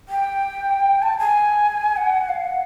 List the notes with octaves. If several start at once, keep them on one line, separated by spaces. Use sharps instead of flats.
G5
A5
G#5
F#5
F5
F#5